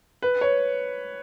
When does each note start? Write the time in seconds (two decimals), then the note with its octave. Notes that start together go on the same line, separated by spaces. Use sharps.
0.22 B4
0.41 C#5